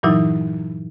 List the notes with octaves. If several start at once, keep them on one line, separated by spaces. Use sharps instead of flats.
G2 A#2 E3 F#3 D#4 E4